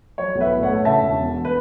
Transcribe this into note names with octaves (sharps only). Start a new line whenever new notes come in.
F#3 C#5
B1
B4 E5
A2
C#5 F#5
A3
C#3 E5 A5
E1
E2
B4